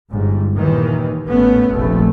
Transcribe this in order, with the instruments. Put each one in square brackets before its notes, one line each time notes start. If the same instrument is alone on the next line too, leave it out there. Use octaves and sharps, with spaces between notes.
[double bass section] G1 G#2
D#2 A#2 D#3 E3
A1 A2 A3 B3 C#4
F1 A#1 A3